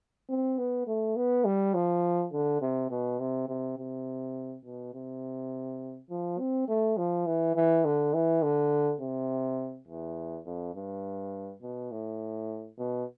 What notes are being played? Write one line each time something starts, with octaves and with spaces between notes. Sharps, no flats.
C4
B3
A3
B3
G3
F3
D3
C3
B2
C3
C3
C3
B2
C3
F3
C4
A3
F3
E3
E3
D3
E3
D3
C3
E2
F2
G2
B2
A2
B2